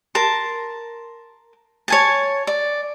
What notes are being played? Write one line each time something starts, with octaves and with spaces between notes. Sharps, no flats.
A#4 A5 C6
C#5 G#5 A5
D5